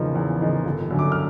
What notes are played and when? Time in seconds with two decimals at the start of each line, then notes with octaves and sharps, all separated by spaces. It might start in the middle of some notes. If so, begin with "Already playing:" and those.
Already playing: E2 C#3 F3 A#3 D#4
0.15 E2
0.41 C#3 F3 A#3 D#4
0.65 G1
0.91 F#2 D3
0.99 D6
1.12 F6